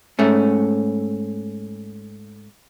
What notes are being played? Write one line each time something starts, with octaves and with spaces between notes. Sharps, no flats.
G#2 A3 C#4